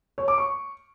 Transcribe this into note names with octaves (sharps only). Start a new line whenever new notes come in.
C#5
D6
C#6